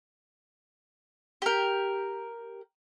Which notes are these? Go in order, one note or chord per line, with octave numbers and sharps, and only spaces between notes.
G4 A#4